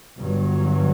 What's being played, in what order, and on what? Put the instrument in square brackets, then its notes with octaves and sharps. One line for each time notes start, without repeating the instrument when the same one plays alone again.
[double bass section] G1 G2 F#3